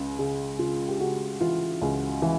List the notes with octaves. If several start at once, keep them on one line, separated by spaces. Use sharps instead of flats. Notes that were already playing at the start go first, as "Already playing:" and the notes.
Already playing: C#2 C#3
C#3
C#3 F4
G4
C#3 F#4
E3 F4
C#2
E3